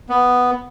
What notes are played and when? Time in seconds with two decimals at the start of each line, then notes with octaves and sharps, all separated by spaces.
0.09 B3